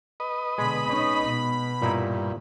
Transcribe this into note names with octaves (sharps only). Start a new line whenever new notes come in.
B4 D#5
B2 D3 G#3 B5
C#4 D#4
B2
G2 A#2 D#4 E4